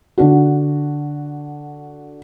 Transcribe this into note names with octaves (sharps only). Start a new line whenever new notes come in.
D3 D4 F#4